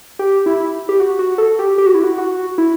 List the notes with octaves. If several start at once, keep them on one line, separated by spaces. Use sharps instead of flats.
G4
E4
G4
F#4
F#4
A4
G4
G4
F#4
E4
F#4
F#4
E4